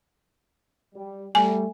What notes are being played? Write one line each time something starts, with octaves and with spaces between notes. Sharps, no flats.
G3
G3 A3 G#5